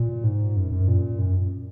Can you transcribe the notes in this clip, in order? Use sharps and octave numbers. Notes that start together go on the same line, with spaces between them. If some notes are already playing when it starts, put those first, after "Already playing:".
Already playing: A#2
G#2
F#2
F#2
A#2
F#2